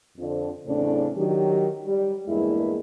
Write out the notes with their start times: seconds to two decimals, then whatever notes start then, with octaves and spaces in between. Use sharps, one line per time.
0.17 F2 D3
0.66 E2 A2 C#3 A3 C4 D4
1.16 D#3 F#3 G4
1.84 G3
2.27 E2 G2 G#3 A#3 E4